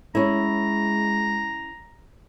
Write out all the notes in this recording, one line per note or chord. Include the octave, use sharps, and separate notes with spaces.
G#3 C#4 E4 A#5